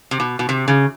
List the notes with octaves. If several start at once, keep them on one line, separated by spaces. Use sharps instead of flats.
C3
B2
B2
C3
C#3